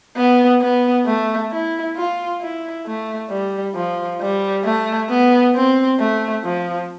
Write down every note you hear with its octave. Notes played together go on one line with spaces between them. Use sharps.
B3
B3
A3
E4
F4
E4
A3
G3
F3
G3
A3
B3
C4
A3
F3